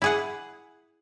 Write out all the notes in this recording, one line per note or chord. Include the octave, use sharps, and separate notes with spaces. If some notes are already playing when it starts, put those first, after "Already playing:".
E4 G#4 F#5